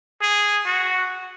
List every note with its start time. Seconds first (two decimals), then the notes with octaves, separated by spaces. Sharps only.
0.22 G#4
0.66 F#4